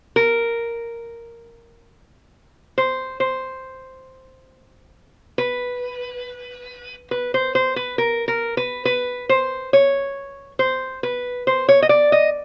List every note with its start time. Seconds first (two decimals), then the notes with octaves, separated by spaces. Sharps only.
0.16 A#4
2.78 C5
3.20 C5
5.38 B4
7.11 B4
7.34 C5
7.55 C5
7.76 B4
7.98 A#4
8.28 A#4
8.57 B4
8.85 B4
9.29 C5
9.73 C#5
10.59 C5
11.03 B4
11.47 C5
11.69 C#5
11.82 D#5
11.89 D5
12.12 D#5